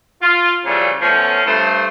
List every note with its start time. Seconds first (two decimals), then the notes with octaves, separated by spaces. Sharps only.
0.22 F4
0.66 C#3 E3 F3 G3 A3 C#4
1.02 F3 A3 B3 C#4
1.47 G2 A3 C5